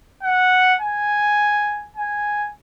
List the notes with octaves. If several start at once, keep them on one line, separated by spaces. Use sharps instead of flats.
F#5
G#5
G#5